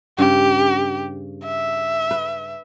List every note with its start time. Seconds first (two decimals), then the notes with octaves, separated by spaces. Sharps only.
0.18 G2 C#3 G4
1.44 E5
2.11 B4